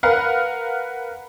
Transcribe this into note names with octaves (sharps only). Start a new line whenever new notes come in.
A#4 B4 F5 F#5